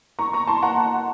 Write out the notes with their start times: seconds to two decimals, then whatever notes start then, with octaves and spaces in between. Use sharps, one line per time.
0.19 A#5 C#6
0.33 A#5 C#6
0.47 A5 C6
0.62 F#5 A#5